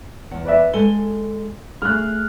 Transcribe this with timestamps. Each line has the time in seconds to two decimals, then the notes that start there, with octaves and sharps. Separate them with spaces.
0.31 E2 F#5
0.45 B4 D5 E5
0.73 G#3 A4 G#5 G7
1.82 A3 G#4 F6 F#6